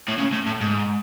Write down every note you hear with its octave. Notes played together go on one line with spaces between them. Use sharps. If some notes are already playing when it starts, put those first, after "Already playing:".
A2
C#3
A2
A2
G#2